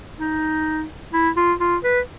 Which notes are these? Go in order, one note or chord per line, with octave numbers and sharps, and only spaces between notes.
D#4
E4
F4
F4
B4